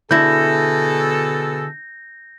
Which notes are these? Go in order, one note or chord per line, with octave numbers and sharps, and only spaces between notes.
B2 D3 E4 G#4 A4 G6 A#6